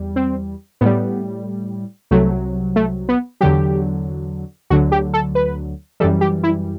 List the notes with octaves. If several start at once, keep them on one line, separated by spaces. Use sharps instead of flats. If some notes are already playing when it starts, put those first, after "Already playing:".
Already playing: E2 G3
C4
A2 G3 B3
C2 C3 F#3 A3
A3
B3
E2 D3 F#3 G4
D2 D3 F#3 F#4
G4
A4
B4
F#2 E3 G3 A4
G4
E4